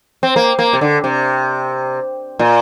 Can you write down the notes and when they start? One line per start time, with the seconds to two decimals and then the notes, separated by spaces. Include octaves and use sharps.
0.23 C4
0.36 A#3
0.59 A#3
0.73 C3
0.81 D3
1.04 C3
2.39 A#2